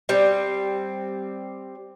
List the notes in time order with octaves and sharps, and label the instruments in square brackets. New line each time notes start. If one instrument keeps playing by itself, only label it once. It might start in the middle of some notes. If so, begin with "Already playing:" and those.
[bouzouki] G3 C4